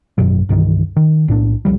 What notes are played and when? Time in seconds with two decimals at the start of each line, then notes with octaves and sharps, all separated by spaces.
0.18 G#1 F#2 B2 F#3
0.49 C2 G2 D#3 E3
0.96 D#3
1.28 B1 A2 D4
1.65 C2 B2 F3 G3